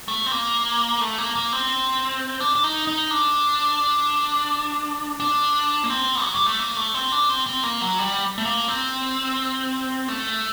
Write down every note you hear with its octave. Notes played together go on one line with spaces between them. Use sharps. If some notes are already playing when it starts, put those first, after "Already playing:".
A3
C4
A#3
A3
A#3
A#3
C4
D4
D4
D#4
D#4
D4
D4
A#3
C4
F#3
G3
A3
A#3
A3
C4
D4
C4
C4
A#3
F#3
G3
A3
A#3
C4
A3